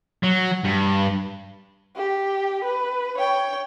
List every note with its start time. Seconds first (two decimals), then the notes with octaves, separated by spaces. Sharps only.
0.23 F#3
0.64 G2
1.96 G4
2.64 B4
3.18 C#5 G5